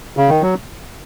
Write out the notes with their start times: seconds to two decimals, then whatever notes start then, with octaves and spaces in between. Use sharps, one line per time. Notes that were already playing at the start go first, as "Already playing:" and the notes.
0.17 C#3
0.29 D#3
0.42 F#3